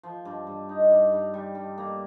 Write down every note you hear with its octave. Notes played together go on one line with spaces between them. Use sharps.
F3
G2
G2
D#4
G2
G2
G3
G2
A#3